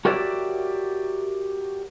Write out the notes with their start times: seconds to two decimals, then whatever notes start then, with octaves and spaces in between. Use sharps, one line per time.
0.05 F#4 G4 A#4 C#5 D5 E5